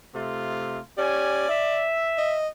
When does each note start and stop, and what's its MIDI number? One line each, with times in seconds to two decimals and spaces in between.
0.13 0.78 48
0.13 0.78 57
0.13 0.78 65
0.98 1.48 61
0.98 1.48 67
0.98 1.85 74
0.98 1.48 80
1.49 2.36 76
2.18 2.48 75